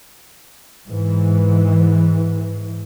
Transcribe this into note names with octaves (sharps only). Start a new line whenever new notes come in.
G#2 E3